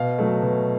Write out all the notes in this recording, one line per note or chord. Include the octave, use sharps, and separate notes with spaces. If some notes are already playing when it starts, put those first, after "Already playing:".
Already playing: B2 F5
F#3 A3
B2